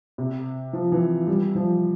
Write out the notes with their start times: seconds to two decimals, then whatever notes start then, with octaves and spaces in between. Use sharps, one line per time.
0.18 C3
0.73 F3
0.92 E3
1.27 G3
1.55 F3